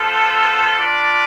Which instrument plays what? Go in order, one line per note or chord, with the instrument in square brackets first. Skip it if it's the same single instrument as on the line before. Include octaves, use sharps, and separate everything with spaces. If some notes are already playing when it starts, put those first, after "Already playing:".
Already playing: [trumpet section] B3 F4 A4 C5
D4 F4 B4 D5